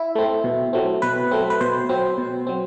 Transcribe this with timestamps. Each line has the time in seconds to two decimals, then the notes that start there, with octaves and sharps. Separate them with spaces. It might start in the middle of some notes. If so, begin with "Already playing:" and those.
Already playing: E4
0.15 A3 C4
0.44 B2
0.73 F#3 A3 C4
1.02 B2 B4
1.31 F#3 A3 C4
1.50 B4
1.61 B2 C5
1.89 F#3 C4
2.18 B2
2.47 F#3 C4